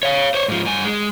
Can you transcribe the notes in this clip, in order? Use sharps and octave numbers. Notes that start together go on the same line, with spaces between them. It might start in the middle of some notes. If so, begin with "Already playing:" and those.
C#5 F5
C5 C#5
G#2 F3
G2 G#5
G#3